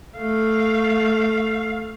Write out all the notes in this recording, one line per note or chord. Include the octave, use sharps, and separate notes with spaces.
A3 F5